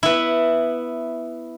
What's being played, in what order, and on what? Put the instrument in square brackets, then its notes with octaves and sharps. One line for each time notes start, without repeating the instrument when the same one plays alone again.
[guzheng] B3 E4